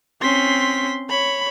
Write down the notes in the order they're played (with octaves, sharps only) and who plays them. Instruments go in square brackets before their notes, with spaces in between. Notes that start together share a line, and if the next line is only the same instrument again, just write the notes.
[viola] C4 C#4 [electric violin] C6 B6
[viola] C#5 [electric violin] B5